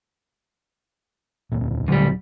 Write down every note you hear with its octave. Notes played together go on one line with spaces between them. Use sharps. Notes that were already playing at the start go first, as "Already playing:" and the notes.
E1 D2 A#2
D#1 D2 A#2 F#3 G3